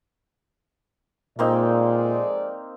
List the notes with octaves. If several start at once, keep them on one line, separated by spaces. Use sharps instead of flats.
F2 A#2 G#3 A#3 C4 D#4 D5